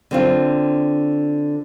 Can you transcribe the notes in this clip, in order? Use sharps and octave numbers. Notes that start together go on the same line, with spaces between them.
D3 C4 F4